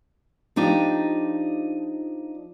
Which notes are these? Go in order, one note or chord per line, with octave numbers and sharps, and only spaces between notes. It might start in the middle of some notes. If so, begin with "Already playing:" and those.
F3 D4 D#4 G4 D5 D#5